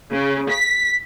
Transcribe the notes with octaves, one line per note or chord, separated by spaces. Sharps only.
C#3
B6